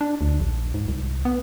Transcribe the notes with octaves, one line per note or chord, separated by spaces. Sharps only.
D4
D2
A#1
G#2
C2
B3